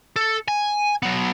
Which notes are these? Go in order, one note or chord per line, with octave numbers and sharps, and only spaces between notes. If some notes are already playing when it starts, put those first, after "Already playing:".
A4
G#5
F#3 B3